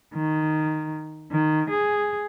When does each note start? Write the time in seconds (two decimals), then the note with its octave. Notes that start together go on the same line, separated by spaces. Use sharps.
0.13 D#3
1.31 D#3
1.69 G#4